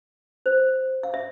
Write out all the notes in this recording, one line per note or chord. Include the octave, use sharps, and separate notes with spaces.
C5
F5
E5